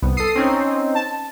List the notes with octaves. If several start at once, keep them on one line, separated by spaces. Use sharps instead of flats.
C2 B3
A4 D#6 C7
C4 C#4 D#4
A5